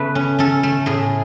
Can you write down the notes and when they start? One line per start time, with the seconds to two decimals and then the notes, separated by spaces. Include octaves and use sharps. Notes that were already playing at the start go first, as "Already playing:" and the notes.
Already playing: C#3 A3 B3 B4
0.15 C#4
0.39 C#4 A4
0.63 A3
0.86 A2 G#4